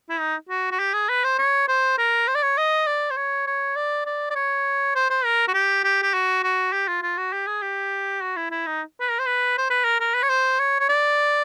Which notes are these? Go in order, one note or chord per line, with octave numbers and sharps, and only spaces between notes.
E4
D#4
F#4
F#4
G4
G#4
B4
C5
C#5
C5
A#4
C5
D5
C#5
D#5
D5
C5
C#5
C#5
D5
D5
D5
C#5
C5
C5
A#4
F#4
G4
G4
G4
F#4
F#4
G4
F4
F4
F#4
G4
G#4
G4
F#4
E4
E4
D#4
B4
A#4
C5
B4
C5
B4
A#4
A#4
B4
C#5
C5
C#5
C#5
D5